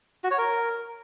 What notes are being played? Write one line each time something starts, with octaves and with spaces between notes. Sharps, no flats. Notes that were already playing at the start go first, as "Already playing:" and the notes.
F#4
C#5
A#4